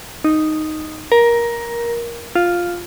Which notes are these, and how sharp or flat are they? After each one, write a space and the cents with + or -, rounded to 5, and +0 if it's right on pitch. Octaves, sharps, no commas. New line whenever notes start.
D#4 -5
A#4 +15
F4 +5